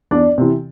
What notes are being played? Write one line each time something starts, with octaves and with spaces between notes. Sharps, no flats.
E2 D4 D5
C3 E3